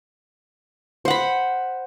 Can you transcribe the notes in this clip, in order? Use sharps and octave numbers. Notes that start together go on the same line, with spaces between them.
C5 F#5 B5